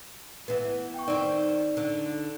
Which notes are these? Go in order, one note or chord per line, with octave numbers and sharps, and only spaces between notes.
E3 B3
G5 C#6
D#3 C4 D#4 D5
D3